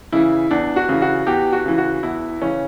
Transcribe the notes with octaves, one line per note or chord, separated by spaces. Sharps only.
C#3 E3 E4
E2 D4
F#4
C#3 E3
F#4
E2 G4
F#4
C#3 E3
F#4
E2 E4
C#3 E3 C#4